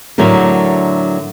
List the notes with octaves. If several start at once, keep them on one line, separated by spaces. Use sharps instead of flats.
A2 D3 F#3 A3 F#4 A#4